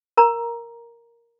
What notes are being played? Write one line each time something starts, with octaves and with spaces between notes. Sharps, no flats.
A#4 A#5